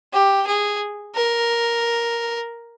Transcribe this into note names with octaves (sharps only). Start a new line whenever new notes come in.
G4
G#4
A#4